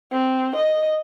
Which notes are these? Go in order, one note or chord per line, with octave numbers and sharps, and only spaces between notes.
C4
D#5